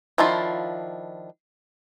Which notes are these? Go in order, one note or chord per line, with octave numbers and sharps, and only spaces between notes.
D#3 F3 D4 E4 F4